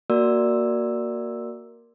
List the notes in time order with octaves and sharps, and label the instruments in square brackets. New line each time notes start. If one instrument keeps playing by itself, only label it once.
[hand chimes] A#3 F#4 A#4 D5 E6